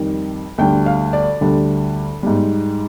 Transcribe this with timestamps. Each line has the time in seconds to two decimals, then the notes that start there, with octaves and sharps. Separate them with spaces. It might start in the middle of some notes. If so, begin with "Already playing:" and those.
Already playing: F2 D#3 G3
0.58 D2 D3 G3 G5
0.86 F5
1.13 D5
1.41 D2 D3 G3
2.23 G#2 G3